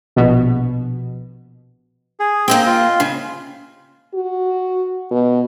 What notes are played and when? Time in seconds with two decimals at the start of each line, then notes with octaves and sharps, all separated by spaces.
0.16 A#1 B2
2.20 G#4
2.48 A#3 C4 D#5 G5
2.67 F4
3.00 C#3
4.14 F#4
5.11 B2